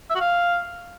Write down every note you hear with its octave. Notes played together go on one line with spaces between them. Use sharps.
E5
F#4
F5